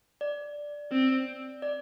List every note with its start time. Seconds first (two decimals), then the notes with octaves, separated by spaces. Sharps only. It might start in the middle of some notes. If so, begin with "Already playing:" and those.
0.21 D5
0.92 C4
1.62 D5